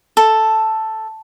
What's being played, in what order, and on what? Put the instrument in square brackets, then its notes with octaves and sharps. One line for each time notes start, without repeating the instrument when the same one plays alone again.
[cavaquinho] A4